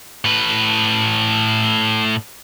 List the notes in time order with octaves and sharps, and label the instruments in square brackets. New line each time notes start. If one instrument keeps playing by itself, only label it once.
[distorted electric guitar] A2 B4